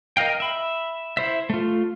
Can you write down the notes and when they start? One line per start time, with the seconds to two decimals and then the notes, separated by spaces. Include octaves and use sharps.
0.17 A#4 D#5 F5 G5
0.40 E5 B5
1.17 E4 C5 E5
1.50 A3 F4